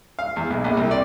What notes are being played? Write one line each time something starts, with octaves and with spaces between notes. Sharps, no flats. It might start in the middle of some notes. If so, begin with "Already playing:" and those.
F5
E2
B1
A#1
C2
D5